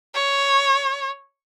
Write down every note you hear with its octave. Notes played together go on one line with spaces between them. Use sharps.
C#5